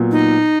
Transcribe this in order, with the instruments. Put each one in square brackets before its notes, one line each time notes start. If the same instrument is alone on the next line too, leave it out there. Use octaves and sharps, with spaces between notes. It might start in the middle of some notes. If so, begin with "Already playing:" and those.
Already playing: [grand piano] A#2 F#3 B3
[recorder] D#4